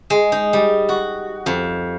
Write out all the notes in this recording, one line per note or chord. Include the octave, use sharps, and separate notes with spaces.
G#3
D#4
G3
F#4
F2